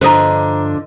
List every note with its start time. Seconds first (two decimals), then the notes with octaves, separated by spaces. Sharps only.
0.01 G2 D3 F3 D4 B4 C5 D#5 A#5